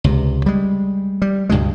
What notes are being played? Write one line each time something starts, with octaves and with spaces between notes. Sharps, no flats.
C#2 C3
G3 G#3
G3
C#2 G2 B2 G#3